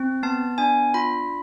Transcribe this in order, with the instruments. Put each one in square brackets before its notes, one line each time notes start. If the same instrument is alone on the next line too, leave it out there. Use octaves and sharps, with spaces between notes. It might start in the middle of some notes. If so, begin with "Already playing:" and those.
Already playing: [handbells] C4
B3 A5
D4 G#5
F4 B5